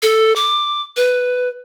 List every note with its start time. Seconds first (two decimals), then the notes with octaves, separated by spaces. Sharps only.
0.03 A4
0.36 D6
0.96 B4